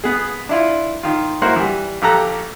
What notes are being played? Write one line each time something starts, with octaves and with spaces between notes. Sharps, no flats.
B3 G#4
D4 E4 F4
D#3 F4
A#3 E4 F#4 A#4 C5 F#5
E3 G3
A#1 G4 A4 A#5 F#6